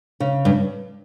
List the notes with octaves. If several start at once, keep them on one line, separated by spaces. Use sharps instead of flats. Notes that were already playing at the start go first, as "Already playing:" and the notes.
C#3
G2